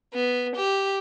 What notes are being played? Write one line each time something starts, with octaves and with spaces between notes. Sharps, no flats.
B3
G4